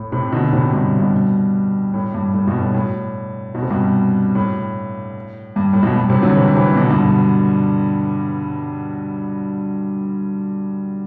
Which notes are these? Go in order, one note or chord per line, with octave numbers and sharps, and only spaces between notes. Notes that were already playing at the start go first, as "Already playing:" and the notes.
Already playing: A2
A2 C3
B2 D3
A2 C3
G2 B2
G2 B2
A2
G2
A2
G2 B2
A2
A2
B2
C3
G2 B2
A2
G2
A2
G2 B2
G2
A2 C3
D3 F#3
C3 E3
C3 E3
B2 D3
G2 B2